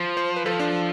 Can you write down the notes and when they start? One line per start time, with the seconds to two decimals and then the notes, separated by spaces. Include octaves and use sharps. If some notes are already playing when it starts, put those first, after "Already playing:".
Already playing: F3
0.17 C5
0.36 B4
0.46 F3 A4
0.60 D4